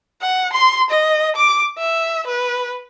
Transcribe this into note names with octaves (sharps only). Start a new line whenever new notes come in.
F#5
C6
D#5
D6
E5
B4